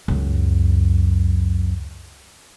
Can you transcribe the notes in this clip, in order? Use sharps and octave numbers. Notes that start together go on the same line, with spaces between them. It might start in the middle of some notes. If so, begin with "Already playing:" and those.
C#2 F#2